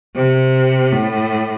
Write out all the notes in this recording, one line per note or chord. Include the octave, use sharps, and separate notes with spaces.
C3
A2